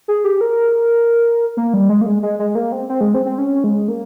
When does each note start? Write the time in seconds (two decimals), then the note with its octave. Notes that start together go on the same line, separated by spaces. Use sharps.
0.08 G#4
0.24 G4
0.41 A#4
1.57 A#3
1.74 G3
1.89 G#3
2.01 A#3
2.06 G#3
2.23 G#3
2.39 G#3
2.55 A#3
2.72 C4
2.89 C4
3.01 G#3
3.14 C4
3.26 C4
3.38 C#4
3.64 G#3
3.88 A#3